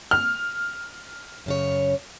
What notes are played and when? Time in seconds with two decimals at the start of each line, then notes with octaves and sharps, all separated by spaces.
0.11 F6
1.46 F#2 C#3 C#5